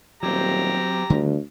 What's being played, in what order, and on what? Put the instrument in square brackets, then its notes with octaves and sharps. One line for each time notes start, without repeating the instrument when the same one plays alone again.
[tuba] D#1 [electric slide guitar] F#3 C4 [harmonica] G4 A#5
[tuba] D2 [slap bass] D3 D#3 G3